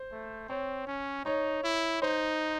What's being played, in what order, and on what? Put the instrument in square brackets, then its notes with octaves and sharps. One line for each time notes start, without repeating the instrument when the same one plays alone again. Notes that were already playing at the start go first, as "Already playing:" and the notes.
Already playing: [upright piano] C5
[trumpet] A3
[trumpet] C4 [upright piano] C#5
[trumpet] C#4
[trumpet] D#4 [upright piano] C#5
[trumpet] E4
[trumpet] D#4 [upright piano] C5